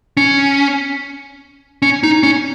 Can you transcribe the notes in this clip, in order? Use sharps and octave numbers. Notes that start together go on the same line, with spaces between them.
C#4
C#4
D#4
C#4